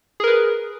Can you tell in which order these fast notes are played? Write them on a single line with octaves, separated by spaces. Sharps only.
G#4 A#4 B4